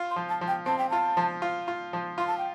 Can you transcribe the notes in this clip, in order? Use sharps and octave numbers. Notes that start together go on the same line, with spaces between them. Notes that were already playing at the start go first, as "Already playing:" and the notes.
Already playing: F4
C6
F3
A5
F3
G5
C4 A5
G5
F4 A5
F3
F4
F4
F3
F4 C6
A5
G5